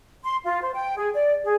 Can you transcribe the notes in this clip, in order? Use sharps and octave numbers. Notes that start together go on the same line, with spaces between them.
C6
F4
C5
G5
G#4
D5
G#4